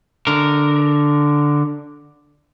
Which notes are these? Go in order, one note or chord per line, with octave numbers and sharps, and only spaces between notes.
D3 A#4